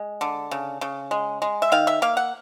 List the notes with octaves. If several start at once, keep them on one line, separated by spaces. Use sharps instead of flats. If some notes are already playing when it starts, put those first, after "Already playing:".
Already playing: G#3
D3
C#3
C#3
G#3
G#3
E5
D#3 F5
E5
A#3 F5
F#5